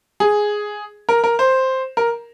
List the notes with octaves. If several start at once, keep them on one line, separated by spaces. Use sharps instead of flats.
G#4
A#4
A#4
C5
A#4